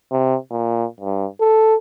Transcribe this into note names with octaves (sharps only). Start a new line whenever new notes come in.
C3
A#2
G2
A4